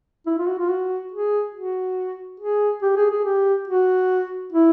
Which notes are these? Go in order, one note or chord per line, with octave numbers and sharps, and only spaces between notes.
E4
F4
F#4
F4
F#4
G#4
F#4
G#4
G4
G#4
G#4
G4
F#4
E4